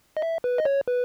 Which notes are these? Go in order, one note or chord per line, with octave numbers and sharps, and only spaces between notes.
D#5
E5
B4
D#5
C#5
B4